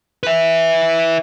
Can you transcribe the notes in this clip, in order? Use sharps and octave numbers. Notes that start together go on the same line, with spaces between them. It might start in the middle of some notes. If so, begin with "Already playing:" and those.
B4 E5